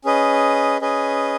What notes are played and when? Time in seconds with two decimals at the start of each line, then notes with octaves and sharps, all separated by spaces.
0.04 C#4 G#4 B4 D#5
0.81 C#4 G#4 B4 D#5